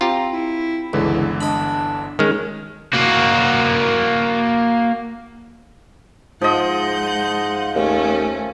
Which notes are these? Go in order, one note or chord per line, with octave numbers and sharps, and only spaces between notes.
C4 F4 G4 A#5
E4
G1 C#2 D3 E3 E4
D4 D#5 B5
D#3 G#3 C#4 F6
A#3 F#4
G#2 F3 G#3 D#5 F#5 G6
D#2 A3 C#4